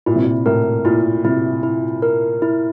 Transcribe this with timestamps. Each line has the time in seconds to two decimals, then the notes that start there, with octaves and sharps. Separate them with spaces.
0.06 A#2 E4
0.16 C3
0.24 A#2
0.46 A2 A#4
0.85 A#2 E4
1.24 C3 E4
1.63 E4
2.02 A#4
2.42 E4